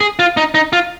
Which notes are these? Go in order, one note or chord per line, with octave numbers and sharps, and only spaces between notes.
G#4
F4
D#4
D#4
F4